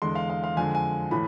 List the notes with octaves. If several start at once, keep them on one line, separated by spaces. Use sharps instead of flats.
E2 D3 G#3 C6
F5
F5
F5
F2 D3 G#3 G#5
G#5
A2 E3 B5